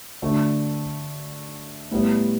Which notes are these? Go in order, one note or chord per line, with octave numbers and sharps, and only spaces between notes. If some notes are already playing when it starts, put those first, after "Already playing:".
D3 A3 D4 F#4
A2 G3 B3